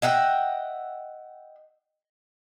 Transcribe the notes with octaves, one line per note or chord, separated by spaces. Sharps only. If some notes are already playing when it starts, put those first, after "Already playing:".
D#5 E5 F#5 G5